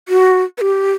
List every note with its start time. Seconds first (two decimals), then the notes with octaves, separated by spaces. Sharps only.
0.09 F#4
0.58 B4
0.61 G4